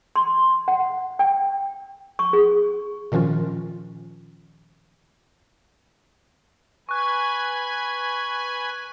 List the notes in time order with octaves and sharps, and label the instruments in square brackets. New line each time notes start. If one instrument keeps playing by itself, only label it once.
[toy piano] C6
F#5
G5
C#6
G#4
[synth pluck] A#2 D#3 F3 C#4 F4
[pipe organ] B4 G#5 [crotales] C#6 F#6